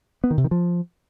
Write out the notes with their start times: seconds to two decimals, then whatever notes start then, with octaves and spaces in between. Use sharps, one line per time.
0.24 B3
0.31 D#3
0.37 C3
0.44 D#3
0.51 F3